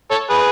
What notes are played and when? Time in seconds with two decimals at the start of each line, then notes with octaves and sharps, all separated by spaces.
0.11 A4 C#5
0.29 G#4 B4